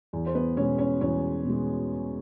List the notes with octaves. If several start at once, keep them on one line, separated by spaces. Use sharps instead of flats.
E2
C5
B3 B4
B2 G#3 C#4 C#5
C#4 C#5
E2 C#4 C#5
B2 G#3